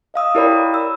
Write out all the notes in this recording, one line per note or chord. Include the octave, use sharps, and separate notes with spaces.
D#5 F5 D#6 E6
E4 G4 A#4 C#5 D5 B5
E6